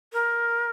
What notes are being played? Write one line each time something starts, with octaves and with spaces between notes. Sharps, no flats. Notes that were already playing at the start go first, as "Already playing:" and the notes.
A#4